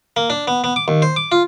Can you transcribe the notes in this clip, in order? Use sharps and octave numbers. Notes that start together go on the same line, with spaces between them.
A#3
D4
B3
B3
D6
D#2
C5
D6
F4